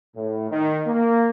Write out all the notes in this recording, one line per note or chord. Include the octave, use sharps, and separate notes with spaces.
A2
D#3
A#3